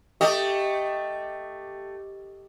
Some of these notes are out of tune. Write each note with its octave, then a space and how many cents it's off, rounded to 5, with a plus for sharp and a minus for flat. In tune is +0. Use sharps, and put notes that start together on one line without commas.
A3 +10 G4 +0 D#5 +0